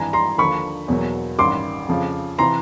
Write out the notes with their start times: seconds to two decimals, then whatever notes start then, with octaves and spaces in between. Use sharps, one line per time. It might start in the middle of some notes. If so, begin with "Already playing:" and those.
Already playing: G#1 G2 E3 G3 G#5 A#5
0.13 A#5 C6
0.38 D#2 D3 F3 B5 C#6
0.88 E2 B2 F#3 A#3
1.39 A1 G2 D#3 C6 D6
1.89 F2 C#3 F3
2.38 C3 E3 A#5 C6